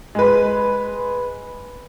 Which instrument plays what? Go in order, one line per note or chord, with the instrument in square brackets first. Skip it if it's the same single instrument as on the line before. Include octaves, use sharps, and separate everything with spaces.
[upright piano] G#3 B4